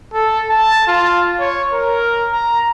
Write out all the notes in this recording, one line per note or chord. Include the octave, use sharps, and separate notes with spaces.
A4
A5
F4
C#5
A#4
A#5